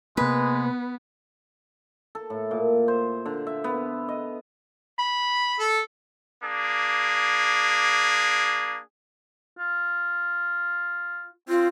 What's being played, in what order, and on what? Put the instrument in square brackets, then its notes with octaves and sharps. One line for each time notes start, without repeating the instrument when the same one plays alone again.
[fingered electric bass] C3 A#3 [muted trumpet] G#3 [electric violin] B3 [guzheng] B4
[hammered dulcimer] A4
A2
A#2
C5
D3
E5
B3
D#5
[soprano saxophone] B5
[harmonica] A4
[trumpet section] A#3 D4 G#4
[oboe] F4
[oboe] C4 [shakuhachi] F4